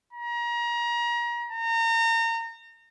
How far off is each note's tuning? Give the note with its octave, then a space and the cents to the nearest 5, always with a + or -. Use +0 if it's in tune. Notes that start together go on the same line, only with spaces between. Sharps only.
A#5 +30
A#5 -30